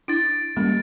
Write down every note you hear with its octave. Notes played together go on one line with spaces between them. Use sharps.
D4 E4 A6 D7
G3 G#3 A#3 C#4